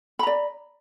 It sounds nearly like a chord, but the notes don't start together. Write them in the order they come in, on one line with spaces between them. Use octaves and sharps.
B5 A#5 D5